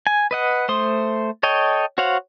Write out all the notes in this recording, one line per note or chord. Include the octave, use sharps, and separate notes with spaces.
G#5
B4 D#5 F#5
A3 C5 C6 D#6
A4 C#5 D#5 G5
F#4 C5 C#5 F5 F#5